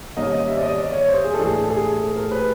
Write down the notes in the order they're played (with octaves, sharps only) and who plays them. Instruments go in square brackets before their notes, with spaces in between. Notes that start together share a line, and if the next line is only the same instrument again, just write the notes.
[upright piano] C3 D#3 G3 A#3 C#4 D#5
D#5
E5
D5
D#5
D5
C#5
C5
G#4
A4
A2 E3 A3 D4 G#4
A4
G#4
A4
A#4
B4